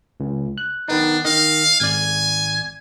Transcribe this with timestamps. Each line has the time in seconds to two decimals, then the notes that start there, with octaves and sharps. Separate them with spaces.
0.20 C#2
0.58 F#6
0.88 D#3 B3 D4 D#4
1.25 D#3 D#5 F5
1.80 G#1 D5 G#5